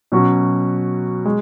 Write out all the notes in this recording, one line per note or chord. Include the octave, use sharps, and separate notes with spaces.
B2 F#3 C#4 F#4
G#3